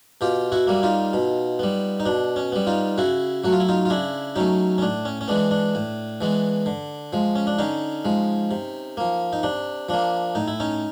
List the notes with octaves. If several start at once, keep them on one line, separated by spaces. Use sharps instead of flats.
B2 F4 G4
E4 F#4
G3 A#3
D#4 F4
B2
G3 B3
D#4
B2 D4
C#4
G3 B3
D#4 F4
C#3 E4 F#4
F#3 A3 F#4
F4
E4
D#4 F4
F4
C#3 D4 E4
F#3 A3 C#4 D#4
C#4
A2 D4
C#4
C#4
E3 G#3 B3 D4
D4
A2
E3 G#3 B3
D3
F3 G#3
C#4
D4
D3 C#4 D#4
F3 G#3
C3
F3 A#3
D#4
C3 D4
F3 A#3 D4
A2 D#4
E4
C#4 D#4